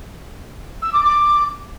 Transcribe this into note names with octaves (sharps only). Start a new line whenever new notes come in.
E6
D6
D6